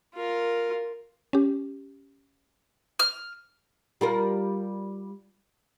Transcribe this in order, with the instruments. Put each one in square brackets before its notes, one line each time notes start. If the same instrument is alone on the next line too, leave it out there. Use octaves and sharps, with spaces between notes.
[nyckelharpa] F4 A#4
[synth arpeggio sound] C#4 G4
[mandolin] F6
[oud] G3 F4 A#4